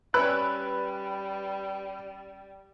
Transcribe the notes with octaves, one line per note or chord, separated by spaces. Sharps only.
G3 C#4 B4 C#5 D5 E6 F#6